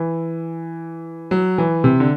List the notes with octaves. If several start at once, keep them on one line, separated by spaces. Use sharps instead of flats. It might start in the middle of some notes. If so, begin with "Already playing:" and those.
Already playing: E3
F#3
E3
C3
D3